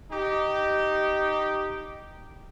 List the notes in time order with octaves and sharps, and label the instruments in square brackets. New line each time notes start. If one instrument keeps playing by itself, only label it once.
[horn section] D#4 G4